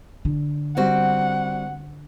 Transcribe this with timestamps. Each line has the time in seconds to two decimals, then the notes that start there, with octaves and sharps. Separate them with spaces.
0.25 D3
0.77 G3 C4 F#4 F#5